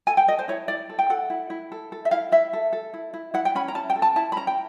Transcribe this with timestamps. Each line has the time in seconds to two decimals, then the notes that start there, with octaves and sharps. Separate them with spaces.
0.07 A4 G#5
0.17 G5
0.28 A4 D#5
0.39 C5
0.48 E4 C#5
0.68 E4 D5
0.90 A4
0.99 G5
1.10 A4 F#5
1.30 E4
1.50 E4
1.72 A4
1.92 A4
2.05 E5
2.11 E4 F5
2.32 E4 E5
2.53 A4
2.73 A4
2.94 E4
3.14 E4
3.34 E4 F#5
3.45 G5
3.55 C#4 B5
3.68 A#5
3.75 C#4 A5
3.90 G5
3.96 A4
4.02 A5
4.16 E4 A5
4.32 B5
4.36 C#4 A#5
4.47 G5